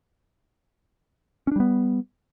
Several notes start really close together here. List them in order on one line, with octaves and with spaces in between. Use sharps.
C#4 D4 G3 B3